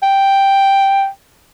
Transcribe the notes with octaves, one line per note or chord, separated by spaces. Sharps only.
G5